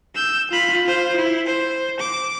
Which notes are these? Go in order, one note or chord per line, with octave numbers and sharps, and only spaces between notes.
E6 G6
F4 B5
F4 C5
E4
C5
D6